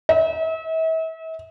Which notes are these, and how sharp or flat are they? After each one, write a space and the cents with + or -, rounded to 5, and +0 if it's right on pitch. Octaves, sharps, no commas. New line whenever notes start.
E5 -40